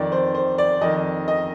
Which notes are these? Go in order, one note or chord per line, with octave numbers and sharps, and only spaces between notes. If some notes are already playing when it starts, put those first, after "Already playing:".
Already playing: F2 D#3 D5
C5
C5
D5
F2 D#3 D#5
D#5